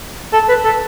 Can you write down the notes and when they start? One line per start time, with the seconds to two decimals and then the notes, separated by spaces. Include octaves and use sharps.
0.33 A4
0.49 B4
0.64 A4